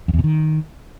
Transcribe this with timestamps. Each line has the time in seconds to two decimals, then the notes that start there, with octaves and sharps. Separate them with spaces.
0.08 F2
0.14 E2
0.19 B2
0.24 D#3